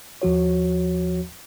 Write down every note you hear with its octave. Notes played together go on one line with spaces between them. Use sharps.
D#2 F3 F#4 C#5